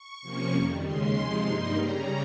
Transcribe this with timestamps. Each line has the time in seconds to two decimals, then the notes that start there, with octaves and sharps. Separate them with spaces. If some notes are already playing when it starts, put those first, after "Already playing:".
Already playing: C#6
0.22 C3 F3 A#3 C#4
0.53 F2 D#3 G3
0.83 D#2 C#3 G#3 C#4 C6
1.14 C3 F3 G#3 D#4
1.44 G2 G3 A#3 D#4 C6
1.75 C#3 G3 C#4 A#5